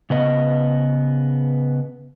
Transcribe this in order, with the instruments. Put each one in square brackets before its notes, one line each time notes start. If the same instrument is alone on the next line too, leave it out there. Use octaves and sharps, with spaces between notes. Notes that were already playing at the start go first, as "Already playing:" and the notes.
[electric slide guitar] C#3 B3 D#5